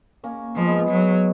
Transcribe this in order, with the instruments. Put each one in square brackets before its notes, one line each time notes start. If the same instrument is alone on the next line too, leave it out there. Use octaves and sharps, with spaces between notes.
[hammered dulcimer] A#3 C#4
[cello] F3 [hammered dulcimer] G#3 B3
[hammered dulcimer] G#3 B3
G#3 B3
[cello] F#3